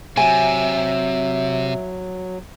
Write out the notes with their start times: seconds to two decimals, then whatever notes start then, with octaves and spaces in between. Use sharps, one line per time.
0.17 C3 F#3 E5 G#5